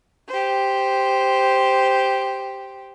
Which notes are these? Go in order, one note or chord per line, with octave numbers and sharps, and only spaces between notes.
G4 C5